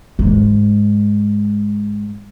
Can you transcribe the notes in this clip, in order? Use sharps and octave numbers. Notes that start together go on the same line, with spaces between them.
G#2 G#3